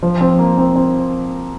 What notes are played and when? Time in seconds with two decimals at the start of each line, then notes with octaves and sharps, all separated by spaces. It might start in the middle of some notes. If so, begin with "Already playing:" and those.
0.03 F3
0.21 C4
0.39 A#3
0.58 C4
0.76 C4